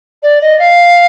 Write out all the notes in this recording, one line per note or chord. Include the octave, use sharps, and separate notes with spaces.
D5
D#5
F5